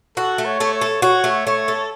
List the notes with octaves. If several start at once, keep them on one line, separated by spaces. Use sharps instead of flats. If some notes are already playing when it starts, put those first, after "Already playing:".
F#4 A4
A3
C#5
A3
C#5
A4
F#4 C#5
A3
A3 C#5
A4